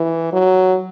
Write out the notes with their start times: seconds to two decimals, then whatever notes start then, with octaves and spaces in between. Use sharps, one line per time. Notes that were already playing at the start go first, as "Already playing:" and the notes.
Already playing: E3
0.33 F#3